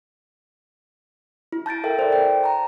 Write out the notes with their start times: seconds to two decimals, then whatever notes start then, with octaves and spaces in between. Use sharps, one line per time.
1.52 E4
1.66 A5 G6 A6 D7
1.84 A4 A#4 E5 G5
1.99 C5 D5
2.12 G5
2.44 A5 A#5